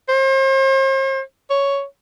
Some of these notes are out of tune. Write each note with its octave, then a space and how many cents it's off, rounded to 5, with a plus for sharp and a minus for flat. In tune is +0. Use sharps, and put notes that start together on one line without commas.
C5 +40
C#5 +5